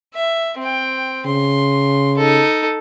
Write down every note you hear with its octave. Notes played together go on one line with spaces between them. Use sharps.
E5
C4 G5
C#3 C6
D#4 A4